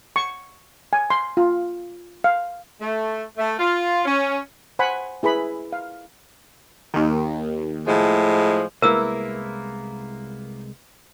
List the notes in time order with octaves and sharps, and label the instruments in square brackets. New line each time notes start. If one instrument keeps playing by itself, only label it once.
[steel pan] C#6
G#5
C6
F4
F5
[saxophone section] A3
A3
F4
C#4
[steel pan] C5 F#5 G#5 B5
E4 G#4 B4 B5
F5
[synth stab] D#2 D#3
[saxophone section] A2 F3 G#3
[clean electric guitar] C2 G#3 [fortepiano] A#3 B3 E4 [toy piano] A#4 E6